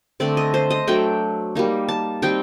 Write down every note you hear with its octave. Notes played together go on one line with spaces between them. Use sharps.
D3 A3 C4 D5
D#5
C5
D#5
F#3 A3 D4 G5
G3 A#3 D#4
A5
G3 C4 D#4 G5